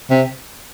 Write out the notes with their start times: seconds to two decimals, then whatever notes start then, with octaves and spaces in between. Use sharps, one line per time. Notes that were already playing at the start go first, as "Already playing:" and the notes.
0.11 C3